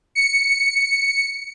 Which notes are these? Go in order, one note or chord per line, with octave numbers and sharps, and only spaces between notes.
C#7